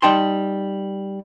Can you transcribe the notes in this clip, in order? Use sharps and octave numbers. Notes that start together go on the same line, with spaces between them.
G3 D#4 G5 A5 C6